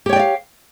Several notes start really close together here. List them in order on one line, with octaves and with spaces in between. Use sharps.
G4 C#5 G5 D5 F5